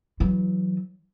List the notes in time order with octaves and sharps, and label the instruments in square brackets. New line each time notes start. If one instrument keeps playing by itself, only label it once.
[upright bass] E3 F#3